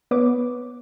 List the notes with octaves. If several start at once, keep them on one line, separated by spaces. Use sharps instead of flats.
B3 B4 C#5 D6